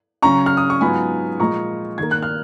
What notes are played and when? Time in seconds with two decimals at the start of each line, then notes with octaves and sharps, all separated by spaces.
0.22 C#3 F#3 C#4 A#5 C#6
0.46 F6
0.57 D#6
0.70 C#6
0.81 G#2 F#3 B3 F4 G#5 B5
1.40 A#2 F3 G#3 A#5 C#6
1.98 D#2 D#3 A#3 G#6
2.11 F#6
2.22 F6